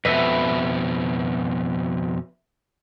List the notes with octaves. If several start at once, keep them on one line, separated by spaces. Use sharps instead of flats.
F2 B2 B4 E5